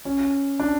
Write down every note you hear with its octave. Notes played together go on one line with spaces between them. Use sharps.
C#4
D4